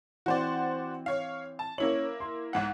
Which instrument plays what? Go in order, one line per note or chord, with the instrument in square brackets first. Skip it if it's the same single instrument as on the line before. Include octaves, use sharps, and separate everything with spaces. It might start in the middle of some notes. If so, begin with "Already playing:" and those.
[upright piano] E3 C4 [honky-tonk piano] F#4 C5 D5
[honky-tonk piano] C#5 F5
A5
[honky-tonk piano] A#3 E4 F#7 [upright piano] C#4 C#5
[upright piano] C6
[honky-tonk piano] B1 G#2 F#5